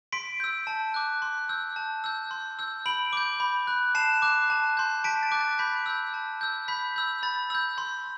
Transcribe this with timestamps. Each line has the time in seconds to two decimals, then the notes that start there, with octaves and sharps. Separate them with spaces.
0.12 C6 B6 D7
0.40 E6 G6
0.67 A5
0.94 D6 F#6
1.22 C6
1.49 E6 G6
1.76 A5
2.04 E6 G6
2.31 C6
2.59 E6 G6
2.86 B5 D7 F#7
3.13 D6 G6
3.40 B5
3.67 F#6
3.95 A5 C7 E7
4.22 D6 F#6
4.50 A5
4.77 C6 G6
5.04 A5 B6 D7
5.23 A6
5.32 D6 F#6
5.40 A6
5.59 B5 G6 B6
5.86 E6 G6
6.14 A5
6.41 E6 G6
6.68 B5 G6 B6
6.96 E6 G6
7.23 B5 A6
7.50 E6 G6
7.78 C6